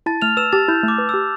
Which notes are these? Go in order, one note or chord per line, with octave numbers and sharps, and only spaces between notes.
E4 A5 A6
A3 F6 F7
B4 E6 E7
G4 A5 A6
E4 G6
A3
D6
B4
E6
G4